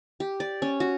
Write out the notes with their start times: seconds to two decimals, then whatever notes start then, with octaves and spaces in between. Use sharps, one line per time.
0.20 G4
0.40 D5
0.62 C#4
0.80 F#4